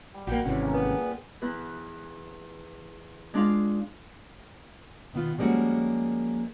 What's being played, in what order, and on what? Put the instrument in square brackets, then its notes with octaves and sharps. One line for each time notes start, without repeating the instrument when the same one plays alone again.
[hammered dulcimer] G3
[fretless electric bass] A#1 A#3 [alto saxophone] F#4 [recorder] G5
[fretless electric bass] G#1 C3 E3 [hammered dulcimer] A3 [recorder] C#4
[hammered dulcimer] C#3 A#3 G5
[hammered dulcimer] C#3 [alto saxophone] B3
[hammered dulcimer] A#2
[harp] E2 B4
G#3 D4 F4 F5
[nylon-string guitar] B2 D#3 B3 F4
F3 G3 G#3 A#3 C#4 F#4